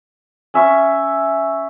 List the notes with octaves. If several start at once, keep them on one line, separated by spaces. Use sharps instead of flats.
C#4 E5 C#6